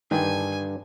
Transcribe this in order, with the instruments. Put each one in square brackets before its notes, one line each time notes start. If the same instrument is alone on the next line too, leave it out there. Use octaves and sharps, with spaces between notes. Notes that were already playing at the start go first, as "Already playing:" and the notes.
[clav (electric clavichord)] G2 D3 [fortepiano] D#3 [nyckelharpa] G#5